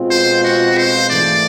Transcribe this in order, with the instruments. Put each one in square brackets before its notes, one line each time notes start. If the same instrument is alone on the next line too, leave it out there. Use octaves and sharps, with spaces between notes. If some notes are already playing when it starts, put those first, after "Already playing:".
Already playing: [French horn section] B2 G#3 C4 F4
[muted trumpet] C5
F#4
C5
[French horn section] G#2 E3 A3 [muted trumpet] D5